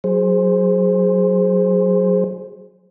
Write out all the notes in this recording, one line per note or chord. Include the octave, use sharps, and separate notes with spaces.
F#3 G#4 C5